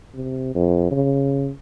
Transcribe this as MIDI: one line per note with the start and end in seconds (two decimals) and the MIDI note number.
0.14 0.52 48
0.55 0.87 41
0.91 1.50 49